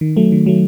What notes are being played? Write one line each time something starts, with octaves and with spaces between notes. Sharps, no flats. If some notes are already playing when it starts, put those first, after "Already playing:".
D#3
F#3 A3
D#3
F#3 A3